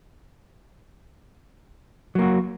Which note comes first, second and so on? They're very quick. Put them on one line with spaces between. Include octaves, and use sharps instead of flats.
F#3 A#3 F#4